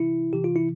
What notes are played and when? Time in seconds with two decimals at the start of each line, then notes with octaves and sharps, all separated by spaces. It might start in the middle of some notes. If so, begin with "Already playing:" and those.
Already playing: C3 E3 E4
0.32 C3 E3 G4
0.44 F4
0.56 E4